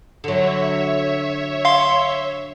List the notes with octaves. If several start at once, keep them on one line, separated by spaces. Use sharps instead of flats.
D3 F#3 C#5 E5
F5 C6